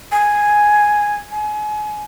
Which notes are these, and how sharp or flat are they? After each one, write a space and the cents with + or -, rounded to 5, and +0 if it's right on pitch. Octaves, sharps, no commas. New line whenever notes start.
G#5 +0
G#5 +30